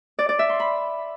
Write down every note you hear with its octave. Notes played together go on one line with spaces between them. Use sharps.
D5
D5
E5
C6
B5